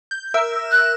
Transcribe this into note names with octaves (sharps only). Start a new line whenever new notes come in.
G6
A#4 E5 E6
F#6